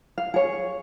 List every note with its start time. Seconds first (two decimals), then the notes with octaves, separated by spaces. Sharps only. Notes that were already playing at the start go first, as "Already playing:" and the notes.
0.18 F5
0.34 G#4 C#5